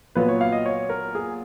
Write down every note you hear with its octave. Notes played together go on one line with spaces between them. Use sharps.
A#2 F#3 B3 F4 B4
C#5
F5
D#5
C#5
A#4
G#4